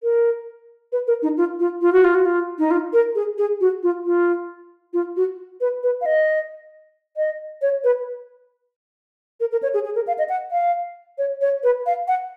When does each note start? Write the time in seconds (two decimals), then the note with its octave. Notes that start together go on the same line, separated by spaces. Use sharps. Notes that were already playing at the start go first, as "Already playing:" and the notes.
0.03 A#4
0.92 B4
1.07 A#4
1.23 D#4
1.37 F4
1.60 F4
1.82 F4
1.93 F#4
2.04 F4
2.15 F#4
2.25 F4
2.59 D#4
2.71 F4
2.93 A#4
3.15 G#4
3.38 G#4
3.61 F#4
3.83 F4
4.05 F4
4.93 F4
5.16 F#4
5.61 B4
5.83 B4
6.01 F5
6.06 D#5
7.17 D#5
7.62 C#5
7.84 B4
9.40 A#4
9.52 A#4
9.63 C#5
9.74 G#4
9.85 G#4
9.95 A#4
10.07 F5
10.18 D#5
10.29 F#5
10.51 F5
11.18 C#5
11.41 C#5
11.64 B4
11.86 F5
12.08 F#5